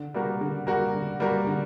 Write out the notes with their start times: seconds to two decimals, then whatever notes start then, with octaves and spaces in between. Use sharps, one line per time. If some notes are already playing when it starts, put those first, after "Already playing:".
Already playing: D3
0.14 G3 A#3 F#4 A#4
0.41 D3
0.67 G3 A#3 F#4 A#4
0.95 D3
1.20 G3 A#3 F#4 A#4
1.47 D3